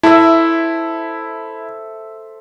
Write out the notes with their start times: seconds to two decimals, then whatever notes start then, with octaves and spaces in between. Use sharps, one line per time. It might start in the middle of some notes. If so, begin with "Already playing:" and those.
0.03 E4 A4 C5 E5